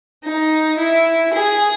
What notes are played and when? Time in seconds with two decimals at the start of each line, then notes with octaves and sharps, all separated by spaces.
0.24 D#4
0.77 E4
1.33 G#4